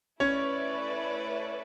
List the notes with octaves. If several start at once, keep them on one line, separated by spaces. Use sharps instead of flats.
A3 C#4 E4 B4 C#5 D5